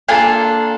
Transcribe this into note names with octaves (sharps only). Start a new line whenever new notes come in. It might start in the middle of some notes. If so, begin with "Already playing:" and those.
A#3 D4 F4 A4 G#5